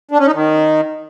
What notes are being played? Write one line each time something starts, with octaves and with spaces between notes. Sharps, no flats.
D4
C#4
D#4
D#3